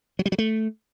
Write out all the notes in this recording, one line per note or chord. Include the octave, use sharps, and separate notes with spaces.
F#3
G3
F#3
A3